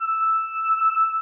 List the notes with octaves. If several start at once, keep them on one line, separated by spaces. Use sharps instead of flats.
E6